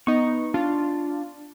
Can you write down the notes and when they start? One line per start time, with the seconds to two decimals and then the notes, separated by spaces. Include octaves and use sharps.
0.07 B3 D#4 C#6
0.54 D4 F4